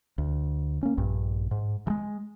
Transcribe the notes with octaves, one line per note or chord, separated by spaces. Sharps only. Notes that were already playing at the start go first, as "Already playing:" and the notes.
D2
A#3 C#4
A#1 G2
G#2
E3 G#3